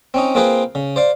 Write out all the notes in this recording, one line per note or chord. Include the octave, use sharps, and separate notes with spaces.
C4 C#4 D#4
A#3 C4 F4 G#4 B4 C5
C#3
C5 D5 F5